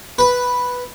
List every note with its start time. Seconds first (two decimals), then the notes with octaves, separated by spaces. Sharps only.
0.19 B4